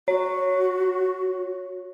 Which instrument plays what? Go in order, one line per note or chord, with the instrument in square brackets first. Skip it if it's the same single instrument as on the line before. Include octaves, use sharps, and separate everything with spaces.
[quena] F#4 [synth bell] C#5